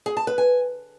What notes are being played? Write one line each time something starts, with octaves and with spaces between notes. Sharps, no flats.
G#4
A5
B4
G#5